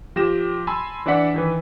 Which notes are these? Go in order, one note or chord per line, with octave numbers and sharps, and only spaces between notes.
F3 G4 A#6 E7
G#5 A5 B5 C6 E6
E3 D4 D5 E5 F#5 B6
D#3 E3 B4